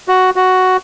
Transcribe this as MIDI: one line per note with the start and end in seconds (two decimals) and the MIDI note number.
0.08 0.30 66
0.36 0.77 66